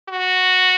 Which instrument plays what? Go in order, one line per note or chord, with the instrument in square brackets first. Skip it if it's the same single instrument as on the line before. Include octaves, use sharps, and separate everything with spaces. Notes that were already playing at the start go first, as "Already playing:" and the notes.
[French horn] F#4